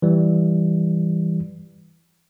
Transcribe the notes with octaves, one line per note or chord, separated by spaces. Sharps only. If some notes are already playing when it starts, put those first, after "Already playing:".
E3 G3